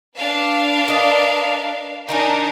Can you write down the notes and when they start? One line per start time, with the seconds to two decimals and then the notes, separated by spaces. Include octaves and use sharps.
0.18 D4 B4 F5
0.88 A#4 D5 D#5
2.09 D#3 D4 D#4 A#4 G#5